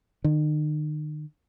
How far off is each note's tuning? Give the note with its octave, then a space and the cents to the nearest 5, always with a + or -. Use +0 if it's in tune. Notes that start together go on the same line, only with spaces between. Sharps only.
D#3 -40